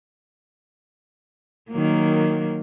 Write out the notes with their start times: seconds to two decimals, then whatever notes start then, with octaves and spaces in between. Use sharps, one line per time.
1.71 D#3 F#3 A#3